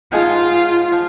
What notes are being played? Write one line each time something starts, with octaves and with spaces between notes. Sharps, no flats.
G#2 F3 G#3 D#4 F4 G#4
F3